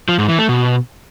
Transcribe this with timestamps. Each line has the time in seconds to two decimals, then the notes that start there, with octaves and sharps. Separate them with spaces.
0.08 F3
0.19 G#2
0.29 E3
0.39 A3
0.49 B2